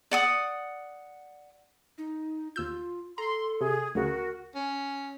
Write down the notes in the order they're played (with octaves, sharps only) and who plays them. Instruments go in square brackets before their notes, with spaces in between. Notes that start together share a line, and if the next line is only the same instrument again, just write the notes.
[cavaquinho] D5 F#5 D#6
[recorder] D#4
[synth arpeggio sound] D#2 E6 G6 [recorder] F4
[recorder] A4 [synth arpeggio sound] A#5 [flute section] C6
[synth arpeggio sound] C3 [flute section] G#4
[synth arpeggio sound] D2 C#3 [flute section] F#4 [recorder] A#4
[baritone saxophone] C#4